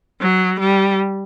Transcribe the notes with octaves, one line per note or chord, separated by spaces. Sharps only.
F#3
G3